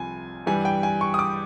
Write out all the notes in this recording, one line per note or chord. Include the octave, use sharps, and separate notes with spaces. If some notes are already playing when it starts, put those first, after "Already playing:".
Already playing: C2 F3 G#5
G2 E3 G3 G#5
G5
G#5
C#6
D#6
D6